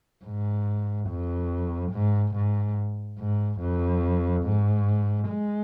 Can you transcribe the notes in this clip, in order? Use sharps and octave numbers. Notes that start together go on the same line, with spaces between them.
G#2
F2
G#2
G#2
G#2
F2
G#2
G#3